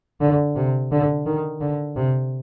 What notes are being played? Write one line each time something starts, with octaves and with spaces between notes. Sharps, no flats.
D3
C3
D3
D#3
D3
C3